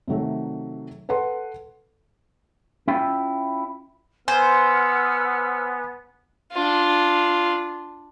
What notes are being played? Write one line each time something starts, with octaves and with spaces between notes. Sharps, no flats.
C3 D#3 F#3 A3
A4 B4 F#5 C6
C#4 E4 F4 E5 G5
B3 C5 F#5 G#5 E6 F6
D4 F4